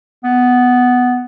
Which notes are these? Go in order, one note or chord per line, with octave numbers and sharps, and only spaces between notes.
B3